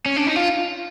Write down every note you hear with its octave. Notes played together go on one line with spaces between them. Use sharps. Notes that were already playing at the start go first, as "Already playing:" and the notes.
C#4
D4
D#4
F4